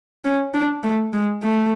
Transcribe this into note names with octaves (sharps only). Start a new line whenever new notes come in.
C#4
D4
A3
G#3
A3